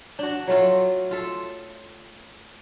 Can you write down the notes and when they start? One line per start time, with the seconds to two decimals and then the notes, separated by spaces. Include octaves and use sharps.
0.19 D4 F#4
0.47 F#3 A3 F4
1.11 F4 A4